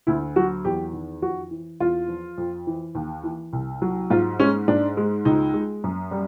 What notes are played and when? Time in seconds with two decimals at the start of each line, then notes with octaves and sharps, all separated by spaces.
0.07 D2 E4
0.36 F#3 F#4
0.65 E2 G4
0.93 D#3
1.22 F2 F#4
1.51 E3
1.80 E2 F4
2.08 F3
2.38 F2
2.67 E3
2.95 D#2
3.23 E3
3.53 C2
3.82 F#3
4.10 G#2 F4
4.40 G#3 C#4
4.68 G#2 D4
4.97 G#3
5.25 C#2 D#4
5.54 G#3
5.84 F#2
6.11 G3